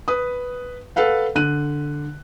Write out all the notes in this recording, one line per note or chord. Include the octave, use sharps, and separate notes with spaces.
B4 D#6
A4 B4 F5 F#5
D3 F#6 D#7